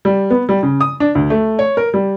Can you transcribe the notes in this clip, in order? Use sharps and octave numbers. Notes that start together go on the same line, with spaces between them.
G3
B3
G3
C#3
D#6
D4
D2
A3
C#5
A#4
G3